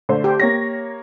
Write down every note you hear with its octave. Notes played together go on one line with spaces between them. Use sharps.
D3 A3 C5
G4
A#3 C#5 A#6